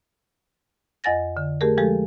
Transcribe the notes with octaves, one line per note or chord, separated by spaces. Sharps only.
F2 D#5 F#5 G#5 A6 A#6
D3
A3 G4 G#4 A#4
F3 G#3 G4 A4